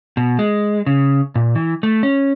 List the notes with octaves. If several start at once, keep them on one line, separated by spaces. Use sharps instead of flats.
B2
G#3
C#3
A#2
E3
A3
C#4